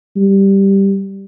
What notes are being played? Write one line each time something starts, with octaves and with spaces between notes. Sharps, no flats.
G3